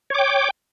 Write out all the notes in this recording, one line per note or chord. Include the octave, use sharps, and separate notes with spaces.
C#5 G5 D6